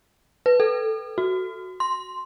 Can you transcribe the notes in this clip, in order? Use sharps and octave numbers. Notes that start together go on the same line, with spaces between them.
B4
A4
F#4
C6